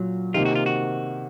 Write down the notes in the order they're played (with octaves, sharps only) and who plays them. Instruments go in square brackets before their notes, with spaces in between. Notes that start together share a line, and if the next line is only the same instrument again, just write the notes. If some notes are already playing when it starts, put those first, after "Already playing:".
Already playing: [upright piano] A#2 [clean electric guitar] F#3
[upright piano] C3 D#3 A#3 [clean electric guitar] F4
[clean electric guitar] F#4
F4
F#4